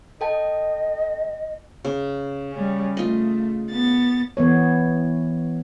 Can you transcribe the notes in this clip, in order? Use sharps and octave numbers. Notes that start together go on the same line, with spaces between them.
A4 D#5 G5 A5
C#3
G3 C#4
A3 F4 D#5
B3 A6
E3 B3 C#5